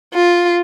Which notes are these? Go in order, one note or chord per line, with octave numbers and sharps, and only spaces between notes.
F4